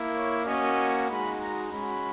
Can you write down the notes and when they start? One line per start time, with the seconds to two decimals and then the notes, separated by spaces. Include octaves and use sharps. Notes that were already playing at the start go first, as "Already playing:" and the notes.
Already playing: A#3 E4
0.14 C#5
0.46 A#3 C#4 F#4 D#5
1.09 G#3 D#4 F#4 B5
1.40 A#5
1.72 G#3 C#4 F#4 B5